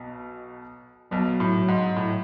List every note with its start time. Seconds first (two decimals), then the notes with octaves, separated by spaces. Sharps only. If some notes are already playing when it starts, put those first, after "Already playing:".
Already playing: B1 B2
1.11 B1 B2 F#3
1.40 A2
1.68 G#2
1.96 A2